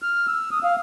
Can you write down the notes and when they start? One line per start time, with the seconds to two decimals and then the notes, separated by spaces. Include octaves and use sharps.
0.02 F6
0.27 E6
0.52 D#6
0.64 F5